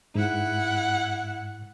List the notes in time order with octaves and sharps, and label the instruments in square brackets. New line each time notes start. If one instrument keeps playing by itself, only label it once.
[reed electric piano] G#2 [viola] E4 F#5